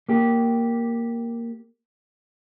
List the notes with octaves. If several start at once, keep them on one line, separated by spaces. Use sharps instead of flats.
A#3 G4